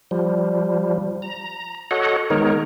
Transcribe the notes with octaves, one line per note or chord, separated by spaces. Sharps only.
F3 G3
A#5
F#4 A4 C#5 D#5 F#5
D#3 G#3 B3 D#4 A#4 C#5